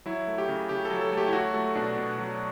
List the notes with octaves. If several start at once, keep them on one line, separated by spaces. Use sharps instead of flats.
F#3 E4
A3
G4
C#3
C#3 G4
A4
F#3
A4
A3
G4
E4
F#3 F#4
A3
B2 D4
B2
F#3